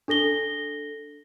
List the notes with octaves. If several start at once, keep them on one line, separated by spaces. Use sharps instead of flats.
D4 A4 A#6 G7